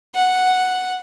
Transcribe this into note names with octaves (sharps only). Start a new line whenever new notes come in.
F#5